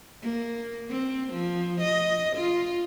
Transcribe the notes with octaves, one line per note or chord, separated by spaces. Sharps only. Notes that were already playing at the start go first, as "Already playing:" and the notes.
A#3
C4
F3
D#5
F4